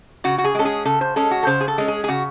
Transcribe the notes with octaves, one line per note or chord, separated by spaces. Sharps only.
C#3 F#4
F#4
G#4
G#3 C#4 A4
G#4
C#3 A4
C5
G#3 C#4 A4
F#4
A4
C#3 C5
G#4
A4
G#3 C#4
G#4
G#4
C#3 F#4